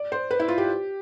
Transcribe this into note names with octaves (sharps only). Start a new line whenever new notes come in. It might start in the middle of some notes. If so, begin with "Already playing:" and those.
Already playing: D5
C5
B4
E4
F4
G4